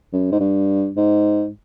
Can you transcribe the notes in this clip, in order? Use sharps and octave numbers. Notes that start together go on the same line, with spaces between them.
F#2
G#2
G2
G#2